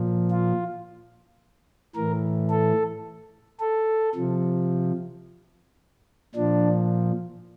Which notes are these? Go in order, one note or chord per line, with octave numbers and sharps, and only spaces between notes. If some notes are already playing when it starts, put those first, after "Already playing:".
Already playing: A#2 F3
F4
A2 E3 A#4
A4
A4
C3 F3
A#2 F3 D4